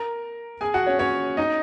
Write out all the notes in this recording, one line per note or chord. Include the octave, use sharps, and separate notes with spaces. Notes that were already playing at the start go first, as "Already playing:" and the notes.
Already playing: A#4 A#5
G#4 G#5
F#4 F#5
C#4 C#5
C#4 C#5
D#4 D#5